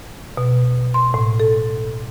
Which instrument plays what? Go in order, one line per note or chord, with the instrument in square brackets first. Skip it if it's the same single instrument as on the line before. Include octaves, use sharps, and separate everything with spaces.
[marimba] B2
C6
A2
A4